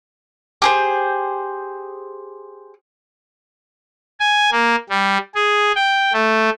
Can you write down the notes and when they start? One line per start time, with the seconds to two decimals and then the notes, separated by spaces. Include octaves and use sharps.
0.62 G4 G#4 C5
4.20 G#5
4.52 A#3
4.90 G3
5.35 G#4
5.75 G5
6.13 A3